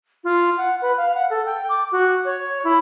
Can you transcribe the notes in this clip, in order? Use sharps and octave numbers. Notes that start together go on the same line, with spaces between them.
F4
F#5
B4
F5
F#5
A4
G5
D6
F#4
C#5
E4